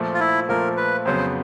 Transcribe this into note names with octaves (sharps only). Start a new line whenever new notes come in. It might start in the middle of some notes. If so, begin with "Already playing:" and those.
Already playing: A#2 F3 A3
F4
E4
A#2 F3 A3 A#4
B4
F2 C#3 F#3 B3 C5